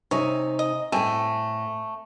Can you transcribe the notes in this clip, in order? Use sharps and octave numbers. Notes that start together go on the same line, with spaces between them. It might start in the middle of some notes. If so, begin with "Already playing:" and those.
C3 D#4 C#5 G#5
D#5
A2 A3 C4 G#5